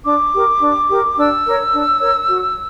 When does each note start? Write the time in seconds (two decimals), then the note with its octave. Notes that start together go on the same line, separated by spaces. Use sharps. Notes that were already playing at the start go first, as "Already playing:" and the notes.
0.05 D4 D6
0.33 G4 A#4
0.60 D4
0.89 G4 A#4
1.16 D4 E6
1.45 A#4 C#5
1.72 D4
2.00 A#4 C#5
2.28 F#4